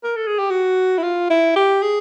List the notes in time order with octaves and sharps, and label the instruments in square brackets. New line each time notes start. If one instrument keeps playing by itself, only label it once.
[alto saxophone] A#4
A4
G#4
G4
F#4
E4
F4
E4
G4
G#4